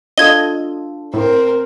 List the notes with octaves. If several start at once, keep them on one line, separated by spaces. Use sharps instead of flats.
D4 F4 A4 D#5 G#6 G7
A2 C4 A#4